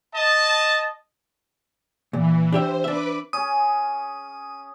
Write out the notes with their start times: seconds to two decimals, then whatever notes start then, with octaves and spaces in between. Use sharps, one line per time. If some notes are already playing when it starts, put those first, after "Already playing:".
0.15 D#5 A5
2.13 A#2 E3
2.52 D4 G4 C5 E5
2.84 D4 B4 E5 D6
3.33 C#4 G#4 D#6